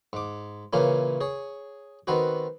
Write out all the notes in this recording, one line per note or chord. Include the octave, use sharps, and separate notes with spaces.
G#2 D6
A#2 C#3 E3 A#3 C#4
G#4 C#5
D#3 B3 C4 F#4